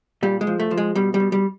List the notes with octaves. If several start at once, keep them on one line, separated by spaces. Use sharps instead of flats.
A#2 G3
G#3
F3
A3
F3
G#3
B2 G3
G3
B2
G3